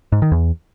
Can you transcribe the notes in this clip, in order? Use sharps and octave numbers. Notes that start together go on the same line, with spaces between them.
G#2
D#3
E2